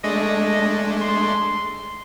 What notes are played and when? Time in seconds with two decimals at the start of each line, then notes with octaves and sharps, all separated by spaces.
0.04 G#3 A3 D4 D#5
1.01 C6